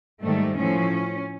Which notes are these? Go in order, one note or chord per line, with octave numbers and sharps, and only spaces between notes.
G#2 D#3 G3 A3
A2 F3 C#4